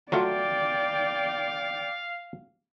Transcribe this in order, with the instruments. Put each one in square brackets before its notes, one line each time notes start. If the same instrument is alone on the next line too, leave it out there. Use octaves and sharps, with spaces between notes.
[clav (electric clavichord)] F#3 A3 F4 [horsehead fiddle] D5 G5 [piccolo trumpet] F5